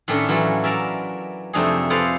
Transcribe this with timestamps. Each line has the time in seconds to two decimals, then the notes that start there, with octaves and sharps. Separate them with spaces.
0.08 A2 D#3 A3 C#4 D4
0.28 E3 F#3 F4
0.64 A#4 D5 E5
1.53 F2 C3 A3 D4 D#4 G#4
1.90 G#4 A4 B4 C5 D5 F5